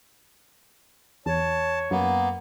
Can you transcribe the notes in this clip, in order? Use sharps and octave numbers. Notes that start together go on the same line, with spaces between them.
E2 C#5 A5
F#2 A#3 B3